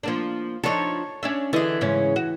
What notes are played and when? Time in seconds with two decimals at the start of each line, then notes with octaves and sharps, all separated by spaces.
0.03 F3 A#3 D4
0.64 F3 D4 D#4 A4 C#5
1.23 C#4 D4 E5
1.53 D3 E3 G#4 D#5
1.81 G#2 C#3 C#4
2.16 F#4